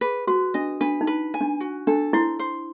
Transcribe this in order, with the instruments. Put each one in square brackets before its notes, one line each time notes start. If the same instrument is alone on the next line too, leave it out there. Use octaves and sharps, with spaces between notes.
[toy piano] G#4 [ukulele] B4
[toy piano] F#4 [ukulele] B4
[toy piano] D4 [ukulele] D#5
[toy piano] D4 [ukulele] B4
[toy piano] D#4
[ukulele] B4
G#5
[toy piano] D4
[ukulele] F#4
[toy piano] D4 [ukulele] A4
[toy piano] E4 [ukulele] C5
[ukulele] C5